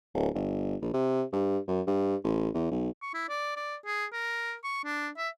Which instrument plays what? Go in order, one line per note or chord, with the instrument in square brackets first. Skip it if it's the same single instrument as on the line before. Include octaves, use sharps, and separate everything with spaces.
[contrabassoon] D1
G1
A#1
C3
G2
F#2
G2
A1
E2
B1
[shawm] C#6
E4
D5
D5
G#4
A#4
C#6
D4
E5